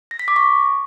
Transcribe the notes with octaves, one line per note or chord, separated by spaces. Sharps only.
A#6
B6
D6
C#6